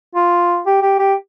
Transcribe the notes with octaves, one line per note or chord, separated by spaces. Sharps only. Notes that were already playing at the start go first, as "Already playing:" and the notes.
F4
G4
G4
G4